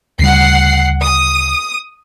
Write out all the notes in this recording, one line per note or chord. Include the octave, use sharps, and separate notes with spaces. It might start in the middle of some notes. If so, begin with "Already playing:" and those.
D2 C#3 G3 F#5 C7
D#6